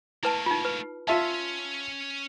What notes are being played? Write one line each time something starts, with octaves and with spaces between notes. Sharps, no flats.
A3 A#3 E4 B4 A5
D#4 F4
B4
C#4 F4 E5 A5